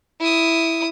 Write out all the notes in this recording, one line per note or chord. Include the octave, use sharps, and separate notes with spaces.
E4 D#6